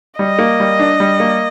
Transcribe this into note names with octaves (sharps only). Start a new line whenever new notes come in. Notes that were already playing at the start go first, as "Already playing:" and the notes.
G3 D#5
A#3
G3
D4
G3
A#3